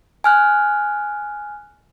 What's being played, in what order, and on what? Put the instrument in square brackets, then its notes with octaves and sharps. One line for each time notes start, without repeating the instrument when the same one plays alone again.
[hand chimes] G#5 F6 F#6